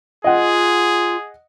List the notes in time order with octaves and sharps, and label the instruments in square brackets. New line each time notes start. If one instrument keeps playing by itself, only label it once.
[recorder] F4 [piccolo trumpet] G#4 [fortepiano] D#5 F#5